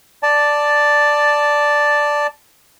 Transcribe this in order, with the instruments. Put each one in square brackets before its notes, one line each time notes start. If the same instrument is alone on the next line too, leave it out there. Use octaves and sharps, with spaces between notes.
[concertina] D5 A5